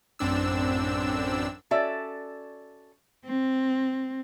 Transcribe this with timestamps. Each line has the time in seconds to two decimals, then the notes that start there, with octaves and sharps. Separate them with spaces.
0.19 A1 F#2 C4 D4 E6
1.71 C#4 F#4 A4 D5 E5
3.25 C4